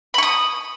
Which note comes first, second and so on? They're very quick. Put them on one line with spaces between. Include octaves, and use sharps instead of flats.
B5 C#6 D#6